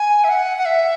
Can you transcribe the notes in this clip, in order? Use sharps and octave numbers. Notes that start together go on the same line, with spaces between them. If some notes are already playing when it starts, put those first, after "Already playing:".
Already playing: G#5
E5
F#5
F#5
E5